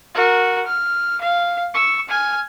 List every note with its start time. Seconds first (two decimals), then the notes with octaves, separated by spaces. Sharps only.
0.15 F#4 A#4
0.66 F6
1.21 F5
1.74 C#6 E6
2.09 G#5 F6